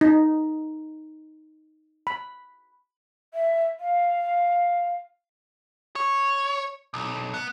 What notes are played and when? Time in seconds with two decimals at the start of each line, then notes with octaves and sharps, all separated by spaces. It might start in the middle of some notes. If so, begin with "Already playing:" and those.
0.01 D#4
2.07 B5
3.34 E5
3.80 F5
5.96 C#5
6.94 B1
7.34 B3